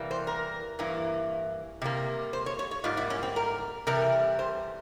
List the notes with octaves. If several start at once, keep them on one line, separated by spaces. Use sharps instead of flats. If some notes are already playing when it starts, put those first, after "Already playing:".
Already playing: C3 E3 G3 A#3
C5
A#4
G2 E3 A#3
C3 G3 A#3
C5
C#5
C#5
C#5
G#2 G3 A#3 F4
E4
C#4
C4
A#4
C3 E3 G3 A#4
C5